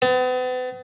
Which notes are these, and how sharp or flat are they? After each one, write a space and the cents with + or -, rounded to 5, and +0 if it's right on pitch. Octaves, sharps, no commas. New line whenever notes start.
B3 +40